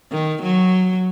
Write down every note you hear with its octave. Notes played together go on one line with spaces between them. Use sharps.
D#3
F#3